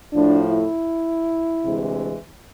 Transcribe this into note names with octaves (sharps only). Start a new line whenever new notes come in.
A2 F3 A3 D4
E4
D2 C3 E3 G#3